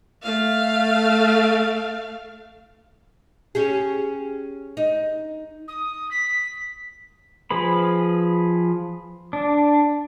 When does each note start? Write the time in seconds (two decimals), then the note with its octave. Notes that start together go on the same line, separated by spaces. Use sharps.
0.22 A3 F5
3.55 C#4 G4 G#4
4.77 D#4
5.68 D#6
6.11 B6
7.51 F3 G#4 B4 B5
9.33 D4